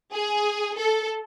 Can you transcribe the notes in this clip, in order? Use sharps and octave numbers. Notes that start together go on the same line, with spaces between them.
G#4
A4